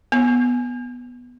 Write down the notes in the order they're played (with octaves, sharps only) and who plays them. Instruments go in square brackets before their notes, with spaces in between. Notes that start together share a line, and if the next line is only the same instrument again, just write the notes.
[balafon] B3